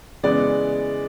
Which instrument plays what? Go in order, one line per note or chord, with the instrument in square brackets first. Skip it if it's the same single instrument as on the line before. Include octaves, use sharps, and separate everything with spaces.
[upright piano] C#3 E3 G#3 B3 D5